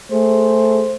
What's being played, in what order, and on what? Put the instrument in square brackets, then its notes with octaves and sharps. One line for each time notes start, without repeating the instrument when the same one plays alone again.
[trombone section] A3 G#4 [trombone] C5